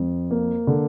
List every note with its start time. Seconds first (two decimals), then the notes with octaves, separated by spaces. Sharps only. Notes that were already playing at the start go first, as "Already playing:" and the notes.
Already playing: F2
0.31 A#3
0.67 D3